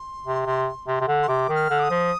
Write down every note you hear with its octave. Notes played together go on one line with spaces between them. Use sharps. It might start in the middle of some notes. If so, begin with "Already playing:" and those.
Already playing: C6
C3
C3
C3
C3
D3
C6
C3 D6
D#3
F6
D3
D6
D#6
F3